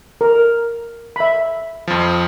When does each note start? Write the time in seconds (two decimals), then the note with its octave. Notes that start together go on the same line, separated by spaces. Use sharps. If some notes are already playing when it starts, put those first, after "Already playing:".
0.21 A#4
1.16 E5 B5
1.88 F2 F3